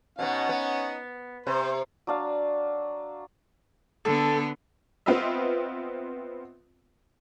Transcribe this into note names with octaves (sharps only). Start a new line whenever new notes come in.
B2 B3 C#4 D#4 F#5
B3
C3 C5
F#3 D4 F5
D3 B3 A4
B3 C4 F4 B4 D#5 E5